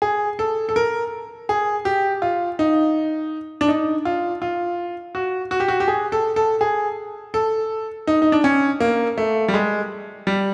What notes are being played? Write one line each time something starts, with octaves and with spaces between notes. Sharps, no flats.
G#4
A4
A4
A#4
G#4
G4
F4
D#4
D4
D#4
F4
F4
F#4
F#4
G4
F#4
G4
G#4
A4
A4
G#4
A4
D#4
D#4
D4
C#4
A#3
A3
G3
G#3
G3